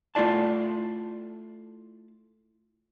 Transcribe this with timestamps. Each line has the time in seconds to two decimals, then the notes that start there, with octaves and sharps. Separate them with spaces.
0.15 A3 E4 F4 D5 A5